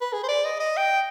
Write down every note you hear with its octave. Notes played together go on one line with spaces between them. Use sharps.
B4
G#4
C5
D5
D#5
D#5
G5